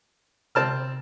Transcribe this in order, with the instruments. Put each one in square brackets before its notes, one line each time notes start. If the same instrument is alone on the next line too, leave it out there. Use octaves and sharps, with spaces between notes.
[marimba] C3 [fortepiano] C4 A5 F6